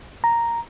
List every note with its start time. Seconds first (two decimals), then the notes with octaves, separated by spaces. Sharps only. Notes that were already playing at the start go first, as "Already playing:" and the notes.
0.24 A#5